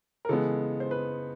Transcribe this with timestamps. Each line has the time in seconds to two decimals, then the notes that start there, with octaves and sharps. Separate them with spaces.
0.25 A#4
0.29 C#3 E3 G#3 B3 A4
0.80 C5
0.91 B4